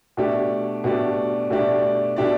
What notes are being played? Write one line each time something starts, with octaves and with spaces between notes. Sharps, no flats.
B2 A3 D4 G4 D5
B2 A3 D4 G4 D5
B2 A3 D4 G4 D5
B2 A3 D4 G4 D5